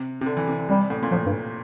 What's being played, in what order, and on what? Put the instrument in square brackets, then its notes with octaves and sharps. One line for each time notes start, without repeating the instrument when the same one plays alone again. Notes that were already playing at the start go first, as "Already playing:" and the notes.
Already playing: [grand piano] C3
C3
D3
E3
C3
D3
[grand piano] C3 [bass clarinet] G3
[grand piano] A2
A#2
[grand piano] A2 [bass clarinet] F3
[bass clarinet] G2